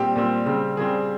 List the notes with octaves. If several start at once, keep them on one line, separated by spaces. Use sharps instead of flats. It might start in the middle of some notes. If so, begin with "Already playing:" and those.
Already playing: A#2 G3 C4 G4
A#2 G3 C4
C#3 G3 C4
C#3 G3 C4 G#4